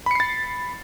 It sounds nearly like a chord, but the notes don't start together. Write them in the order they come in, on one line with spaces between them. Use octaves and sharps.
B5 C#7 C7 A6